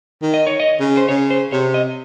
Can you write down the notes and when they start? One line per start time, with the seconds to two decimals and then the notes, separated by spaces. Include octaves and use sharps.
0.22 D#3
0.34 D#5
0.47 C#5
0.60 D#5
0.80 C#3
0.97 C5
1.09 C#3 C#5
1.30 C5
1.52 C3 C#5
1.74 D#5